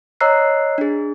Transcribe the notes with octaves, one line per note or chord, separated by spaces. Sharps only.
C#5 D#5 A#5 E6 F#6 C7
D4 G#4